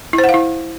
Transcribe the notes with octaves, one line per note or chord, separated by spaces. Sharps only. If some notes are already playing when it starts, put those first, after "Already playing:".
E4
C5
F#5
F5
E4